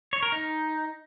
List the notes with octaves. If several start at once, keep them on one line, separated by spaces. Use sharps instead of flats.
C#5
A#4
D#4